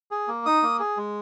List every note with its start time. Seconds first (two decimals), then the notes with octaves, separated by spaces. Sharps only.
0.11 G#4
0.28 A#3
0.46 D#4 D#6
0.63 A#3
0.79 G#4
0.97 G#3